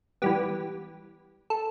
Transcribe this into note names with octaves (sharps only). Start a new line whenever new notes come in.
E3 G3 B3 G4
A4